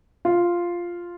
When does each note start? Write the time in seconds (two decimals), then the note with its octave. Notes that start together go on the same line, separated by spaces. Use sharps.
0.25 F4